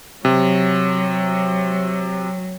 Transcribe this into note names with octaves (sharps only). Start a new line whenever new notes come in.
C3 F#3